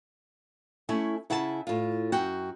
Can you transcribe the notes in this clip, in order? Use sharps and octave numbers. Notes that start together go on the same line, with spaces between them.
A3 C#4 E4 G#5
C#3 E4 F#5 G#5 A5
A2 F4
F#2 F#4 G5